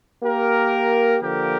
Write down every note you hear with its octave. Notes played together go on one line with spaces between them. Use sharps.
A#3 G4 A#4
D3 F3 A#3 G4 A#4